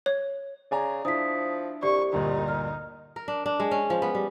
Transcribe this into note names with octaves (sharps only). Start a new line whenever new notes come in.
C#5
C#3 D5 G#5 A#5
F3 D4 E4 D#6 B6
C2 G4 D5 C#6
D2 G2 A#2 D#4
F6
A#4
D4
D4
G#3
C#4
F3
B3
G3